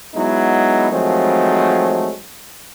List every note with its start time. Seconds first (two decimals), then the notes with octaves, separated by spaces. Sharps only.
0.15 F#3 G#3 B3 D#4 E4
0.91 D#3 F3 F#3 G#3 A3 C4